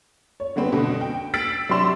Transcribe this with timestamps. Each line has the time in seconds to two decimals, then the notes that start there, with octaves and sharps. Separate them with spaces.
0.40 C#5
0.56 D3 G3 B3 C4 B4
0.72 B2 D3
1.01 G5
1.34 E6 A6 B6 C7 D7 F#7
1.69 C3 F#3 D4 C6 E7